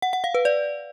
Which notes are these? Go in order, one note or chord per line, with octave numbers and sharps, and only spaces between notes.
F#5
F#5
F5
B4
D5